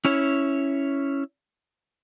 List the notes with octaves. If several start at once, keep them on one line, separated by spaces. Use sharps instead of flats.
C#4 E4 C#5